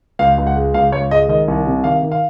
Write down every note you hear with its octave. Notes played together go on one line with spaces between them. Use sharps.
C#2 F5
C#2
F#5
G#3
C#2 F5
C#2 C#5
G#3 D#5
D#3 D#5
C2
C3
D#3 F5
D#3
F5